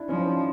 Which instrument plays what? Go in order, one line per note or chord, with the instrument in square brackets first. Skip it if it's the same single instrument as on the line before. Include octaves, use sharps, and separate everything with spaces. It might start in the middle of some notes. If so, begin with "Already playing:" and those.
Already playing: [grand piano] D4 E4
[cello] F3 [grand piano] C#4 D#4
[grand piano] C#4 D#4